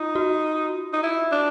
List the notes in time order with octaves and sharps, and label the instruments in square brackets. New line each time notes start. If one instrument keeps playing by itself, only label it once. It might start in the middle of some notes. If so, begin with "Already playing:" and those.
Already playing: [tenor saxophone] D#4 [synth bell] F4
[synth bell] F#4
[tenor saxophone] D#4
E4
D4